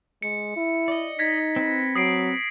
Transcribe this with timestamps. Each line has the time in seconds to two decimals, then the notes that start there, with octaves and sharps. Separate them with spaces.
0.22 G#3 C#7
0.56 E4
0.88 D5 D#5
1.19 D#4 G#6 A#6 B6
1.56 C4 B4
1.95 F#3 D#6 C7 D7